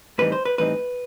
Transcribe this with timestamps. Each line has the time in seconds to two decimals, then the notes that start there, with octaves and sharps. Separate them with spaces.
0.18 A2 E3 G3 C4 D#4 B4
0.32 C5
0.45 B4
0.58 A2 E3 G3 C4 D#4 B4